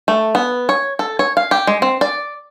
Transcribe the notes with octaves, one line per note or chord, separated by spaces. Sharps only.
A3
B3
C#5
A4
C#5
F5
G4
G#3
C4
D5